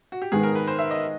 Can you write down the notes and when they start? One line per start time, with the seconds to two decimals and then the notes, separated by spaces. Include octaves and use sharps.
0.12 F#4
0.22 G4
0.32 G#2 D#3 G#3 B3 G#4
0.43 A#4
0.55 B4
0.68 C5
0.79 E5
0.91 D#5